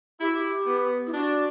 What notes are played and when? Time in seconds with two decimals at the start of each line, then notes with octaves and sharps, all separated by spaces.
0.20 E4 G4
0.28 F#4
0.35 G4
0.66 B3
1.07 E4
1.14 D4 F#4